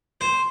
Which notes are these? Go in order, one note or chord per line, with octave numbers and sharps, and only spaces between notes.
C5